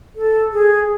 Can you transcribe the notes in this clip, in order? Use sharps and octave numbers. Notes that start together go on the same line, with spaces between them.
A4
G#4